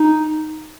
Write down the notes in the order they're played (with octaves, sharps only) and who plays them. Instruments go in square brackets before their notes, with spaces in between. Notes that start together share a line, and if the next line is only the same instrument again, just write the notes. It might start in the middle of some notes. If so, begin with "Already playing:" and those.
Already playing: [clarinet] D#4